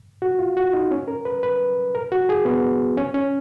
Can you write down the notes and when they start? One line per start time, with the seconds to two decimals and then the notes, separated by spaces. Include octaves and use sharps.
0.22 F#4
0.39 F4
0.57 F#4
0.73 D#4
0.91 C#4
1.08 A#4
1.25 B4
1.43 B4
1.95 A#4
2.12 F#4
2.29 G#4
2.45 B3
2.97 C#4
3.14 C#4